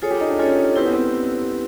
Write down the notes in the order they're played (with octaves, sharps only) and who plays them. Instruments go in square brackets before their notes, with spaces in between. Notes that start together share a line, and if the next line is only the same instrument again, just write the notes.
[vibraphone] F4 A4 C#5 [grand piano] G#4
[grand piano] G4
D#4
D4
[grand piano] C#4 [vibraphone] F4 A4 C#5
[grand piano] C4 [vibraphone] E4 G4 B4
[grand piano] B3
C4